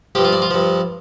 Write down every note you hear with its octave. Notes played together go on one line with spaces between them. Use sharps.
G2 F3 G4
F4
D4
F4
G2 F3